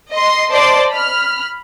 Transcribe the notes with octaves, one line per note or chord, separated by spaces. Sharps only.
D#5 C6
C5 D5 D#5 A5 C6 D6
B5 F6